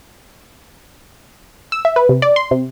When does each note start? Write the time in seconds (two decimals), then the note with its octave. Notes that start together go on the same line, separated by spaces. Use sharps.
1.72 E6
1.85 E5
1.96 B4
2.09 C3
2.22 D5
2.36 C6
2.51 C3